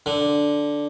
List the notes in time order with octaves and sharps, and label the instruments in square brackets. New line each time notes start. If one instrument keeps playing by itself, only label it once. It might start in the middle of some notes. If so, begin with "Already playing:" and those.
[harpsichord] D3